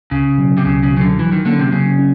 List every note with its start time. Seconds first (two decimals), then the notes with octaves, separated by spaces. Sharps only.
0.11 C#2 C#3
0.38 B2 F#3
0.57 C3
0.65 C#2 C#3
0.83 C#3
0.92 B2 F#3
0.97 C#3
1.01 D3
1.19 E3 F#3
1.32 D#3
1.46 D3 A#3 C#4
1.59 C3
1.72 C#3 F#3
1.99 C#4